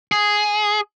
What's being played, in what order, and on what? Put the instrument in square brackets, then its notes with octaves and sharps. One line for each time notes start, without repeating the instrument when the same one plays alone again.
[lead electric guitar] G#4